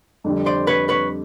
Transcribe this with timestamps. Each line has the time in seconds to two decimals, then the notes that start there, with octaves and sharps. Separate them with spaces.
0.24 F2 D3 G3
0.46 C5 D5
0.67 B4 C#5
0.89 B4 C#5